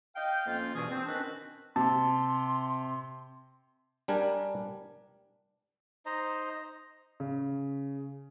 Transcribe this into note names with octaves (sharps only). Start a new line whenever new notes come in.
D#5 F5 G5
F2 A#3 C#4 F4
G2 B2 E3 G#4
C4
D#3 C#4 D4 F#4 B4
C3 A5 C6
G3 D4 G4 A#4 G#5
D#4 C5 D#5 A#5
C#3